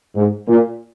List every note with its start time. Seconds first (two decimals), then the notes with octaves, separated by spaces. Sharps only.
0.14 G#2
0.47 A#2